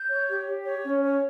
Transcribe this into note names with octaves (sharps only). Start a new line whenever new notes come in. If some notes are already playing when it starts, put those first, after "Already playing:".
Already playing: G6
C#5
G4
G4
C#5
C#4
C#5